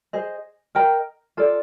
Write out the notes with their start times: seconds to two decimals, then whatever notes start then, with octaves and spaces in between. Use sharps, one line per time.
0.13 G#4 C5 D#5 G#5
0.75 A#4 D#5 G5 A#5
1.37 F4 A4 D5